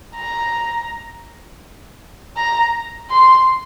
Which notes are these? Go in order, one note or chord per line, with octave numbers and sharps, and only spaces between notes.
A#5
A#5
C6